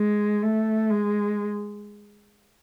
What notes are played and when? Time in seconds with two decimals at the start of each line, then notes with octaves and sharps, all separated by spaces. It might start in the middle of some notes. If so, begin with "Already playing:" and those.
Already playing: G#3
0.42 A3
0.90 G#3